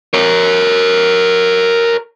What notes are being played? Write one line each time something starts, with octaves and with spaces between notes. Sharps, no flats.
A#4 C#5